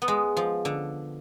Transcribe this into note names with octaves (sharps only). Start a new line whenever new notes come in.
B3
G#3
F3
D3